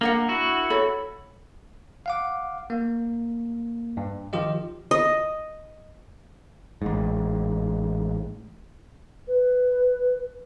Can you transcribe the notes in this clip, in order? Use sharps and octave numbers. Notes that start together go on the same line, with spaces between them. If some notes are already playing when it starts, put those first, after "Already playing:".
A#3 D4 A#4 F#5
E4 F#4
A4 C#5 B5
F5 F#5 D6
A#3
G2
D#3 F3 F4 G4 D#5
D#5
A1 G#2
B4